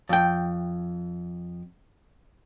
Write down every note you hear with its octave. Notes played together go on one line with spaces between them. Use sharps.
F2 G5